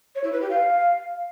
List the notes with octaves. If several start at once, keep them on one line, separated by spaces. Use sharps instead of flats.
C#5
E4
B4
G4
F5